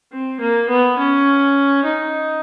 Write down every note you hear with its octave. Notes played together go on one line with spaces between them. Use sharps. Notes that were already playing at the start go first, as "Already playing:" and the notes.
C4
A#3
B3
C#4
D#4